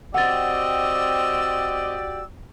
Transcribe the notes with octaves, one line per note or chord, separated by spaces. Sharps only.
C4 F#4 G4 D5 D#5 F#5 E6 A6